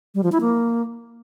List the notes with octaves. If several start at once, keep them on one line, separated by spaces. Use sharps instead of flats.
G3
F3
E4
A#3